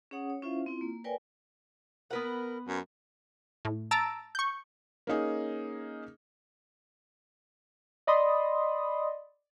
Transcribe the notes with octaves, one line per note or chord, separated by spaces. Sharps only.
C#4 G#4 C#5 F#5 D#6
C#5
C#4 E4 F4 C5 E5 F5
C4 E4 F4
A#3
A#4 B4 C#5 D5 G5 G#5
B3 A#4 B4 F#5
F#2
A2
A5 A#5 E6 A6 D7
C#6 G6
A#3 C#4 D#4 G#4
D5 D#5 B5 C6 D#6